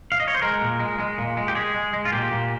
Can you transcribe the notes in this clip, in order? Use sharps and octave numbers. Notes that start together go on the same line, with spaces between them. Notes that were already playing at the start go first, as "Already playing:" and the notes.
F5
D#5
C#5
C5
G#3 A#4
A#2
G#3
G#3
A#2
G#3
G4
G#3 G#4
G#3
G#3
F4
A#2 G4
A#2